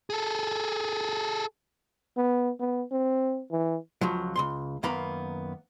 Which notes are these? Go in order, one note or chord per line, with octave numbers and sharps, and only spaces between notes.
G#4 A4
B3
B3
C4
E3
C#2 F3 F#3
C#2 G#2 C6
F#2 D#3 A#3 B3 A#5 B5